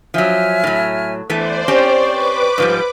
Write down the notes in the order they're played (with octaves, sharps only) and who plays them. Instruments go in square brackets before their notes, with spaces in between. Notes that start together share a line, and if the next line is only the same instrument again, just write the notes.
[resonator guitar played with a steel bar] F3 F#3 [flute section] E5 G#5 F6
[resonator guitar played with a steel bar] A2 F#3
[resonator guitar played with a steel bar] E3 A3 B3 [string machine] C5 D5
[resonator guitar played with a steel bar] C4 C#4 G4 [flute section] C#6
[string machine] B4 D6
[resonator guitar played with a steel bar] G#2 F3 G3